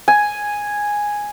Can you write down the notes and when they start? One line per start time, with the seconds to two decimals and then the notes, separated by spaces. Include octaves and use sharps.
0.08 G#5